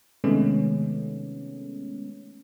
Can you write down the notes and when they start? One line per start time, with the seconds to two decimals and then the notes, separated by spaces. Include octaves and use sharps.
0.24 C3 D#3 G#3 A3 B3 C#4